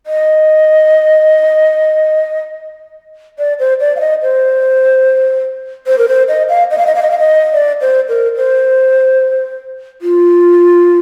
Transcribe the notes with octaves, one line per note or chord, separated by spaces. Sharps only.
D#5
D5
C5
D5
F5
D#5
C5
C5
A#4
C5
D#5
F5
D#5
F5
D#5
F5
D#5
F5
D#5
D5
C5
A#4
C5
F4